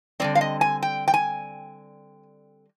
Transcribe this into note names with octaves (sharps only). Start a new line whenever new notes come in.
D3 G3 C4 D5
F5
D#5
G#5
G5
G5
G#5